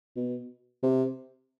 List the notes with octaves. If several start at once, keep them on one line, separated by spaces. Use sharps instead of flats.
B2
C3